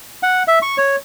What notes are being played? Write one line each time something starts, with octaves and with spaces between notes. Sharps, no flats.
F#5
E5
C#6
C#5